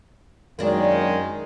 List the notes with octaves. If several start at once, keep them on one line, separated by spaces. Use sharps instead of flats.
F#2 D#3 G#3 A#3 D4